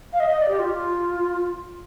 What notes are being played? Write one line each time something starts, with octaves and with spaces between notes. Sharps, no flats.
F5
D#5
D#5
D5
G4
F4